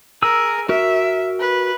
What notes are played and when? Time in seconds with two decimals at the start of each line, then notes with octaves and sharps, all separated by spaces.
0.22 G#4 A#4 E6
0.69 F#4 A#4 E5
1.40 B4